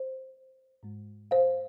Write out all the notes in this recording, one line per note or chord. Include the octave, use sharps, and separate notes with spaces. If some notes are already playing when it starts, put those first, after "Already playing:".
Already playing: C5
G#2 G#3
C5 F5